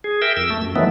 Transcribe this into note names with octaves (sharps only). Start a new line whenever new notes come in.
G#4
A#4 E5 G5
F2 E6
A3
F#2
D#3 E3 F#3 A3 B3